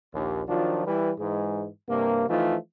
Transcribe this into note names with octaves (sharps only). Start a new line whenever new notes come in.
A#1 D#2
D#3 F3 F#3 D4 F4
E3 G3 E4 B4
G#2 E3 G#3
G2 C3 A#3
E3 F3 A3 D#4 F4